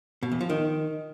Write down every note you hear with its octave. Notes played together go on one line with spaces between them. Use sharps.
B2
E2
F3
D#3